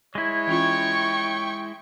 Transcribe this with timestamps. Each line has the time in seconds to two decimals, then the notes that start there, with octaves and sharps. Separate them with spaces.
0.15 G#3 E4 C#5
0.47 E3 C#4 F4 G5 C#6